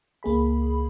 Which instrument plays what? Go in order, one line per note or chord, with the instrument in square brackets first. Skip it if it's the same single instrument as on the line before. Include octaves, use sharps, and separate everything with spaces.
[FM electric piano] C#2 A#3 G#4 B5